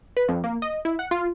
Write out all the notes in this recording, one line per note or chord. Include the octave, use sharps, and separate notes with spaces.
B4
F2
A#3
D#5
E4
F#5
F4